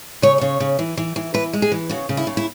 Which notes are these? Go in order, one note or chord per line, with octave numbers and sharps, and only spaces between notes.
C#3 C#5
C#3 C#5
C#3
E3
E3
E3
E3 B4
G#3
G#4
E3
C#3 F#4
C#3
E4
C#3
E4